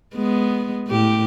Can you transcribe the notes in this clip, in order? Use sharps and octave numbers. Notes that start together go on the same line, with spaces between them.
G#3 B3
A2 G4